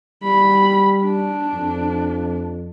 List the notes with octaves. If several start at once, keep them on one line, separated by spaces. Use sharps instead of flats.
G3 B5
D4
F2